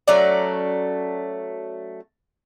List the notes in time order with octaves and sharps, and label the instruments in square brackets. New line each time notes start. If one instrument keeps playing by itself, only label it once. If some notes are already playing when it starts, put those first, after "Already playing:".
[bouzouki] F#3 A3 C#4 D5